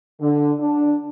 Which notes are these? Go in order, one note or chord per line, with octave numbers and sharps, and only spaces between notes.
D3
D4